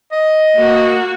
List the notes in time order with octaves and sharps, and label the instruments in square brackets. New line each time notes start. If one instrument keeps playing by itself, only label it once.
[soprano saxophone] D#5
[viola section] A#3 F#4